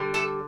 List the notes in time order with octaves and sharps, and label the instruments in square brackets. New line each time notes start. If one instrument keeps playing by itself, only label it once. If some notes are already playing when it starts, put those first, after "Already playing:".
Already playing: [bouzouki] D3 G3
A3 A4